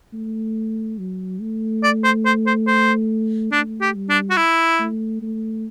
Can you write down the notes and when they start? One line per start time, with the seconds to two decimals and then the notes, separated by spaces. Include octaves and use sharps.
0.13 A3
0.98 F#3
1.41 A3
1.83 D5
2.04 C5
2.26 C5
2.46 C5
2.67 C5
3.52 A3 D4
3.81 G4
3.95 G3
4.10 D4
4.30 F#4
4.37 E4
4.80 A3
5.22 A3